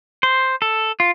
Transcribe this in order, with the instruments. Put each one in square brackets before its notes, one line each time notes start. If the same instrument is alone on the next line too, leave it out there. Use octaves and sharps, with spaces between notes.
[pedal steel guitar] C5
A4
F4